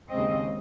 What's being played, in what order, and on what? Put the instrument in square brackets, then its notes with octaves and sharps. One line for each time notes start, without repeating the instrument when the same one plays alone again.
[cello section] D#2 C#3 G#3 C4 D#5